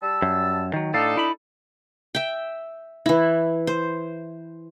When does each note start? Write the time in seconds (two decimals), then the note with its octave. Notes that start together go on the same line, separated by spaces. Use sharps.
0.02 G3 A5 E6
0.22 F#2
0.74 D#3 F#3
0.94 A2 D4 D#4 A4 D5 F5
1.17 E4 B5
2.15 E5 G5
3.06 E3 E4
3.67 C5